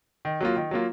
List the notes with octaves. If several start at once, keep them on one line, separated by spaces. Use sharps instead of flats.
D#3
F#3 A#3 F4
D#3
F#3 A#3 F4